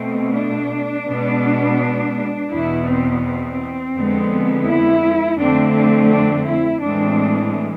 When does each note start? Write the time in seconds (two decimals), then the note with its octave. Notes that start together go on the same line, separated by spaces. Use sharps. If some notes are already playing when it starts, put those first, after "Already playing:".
Already playing: B2 A3 C4
0.36 D4
1.08 B2 G#3 B3
2.51 E2 B2 B3 E4
2.87 C4
3.22 C4
3.95 F2 D3 G#3 B3
4.66 E4
5.38 F2 D3 A3 C4 D4
5.74 D4
6.10 D4
6.45 E4
6.81 A2 E3 G#3 C4 D4